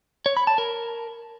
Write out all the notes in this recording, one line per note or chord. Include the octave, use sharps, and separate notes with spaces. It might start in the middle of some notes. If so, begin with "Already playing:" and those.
C#5
B5
A5
A#4